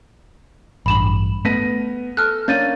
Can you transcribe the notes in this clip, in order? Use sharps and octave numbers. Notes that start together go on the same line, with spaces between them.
A1 G2 B5 E7 F#7
A3 B3 A#6 B6 D#7
A4 F6 F#6
A#3 C#4 D4 G6 A6 D#7